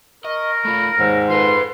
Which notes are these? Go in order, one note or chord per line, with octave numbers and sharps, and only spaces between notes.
A#4 D#5 C#6
A3 F4 B5
D#2 G#2 C#5
F4 A4 B4 C6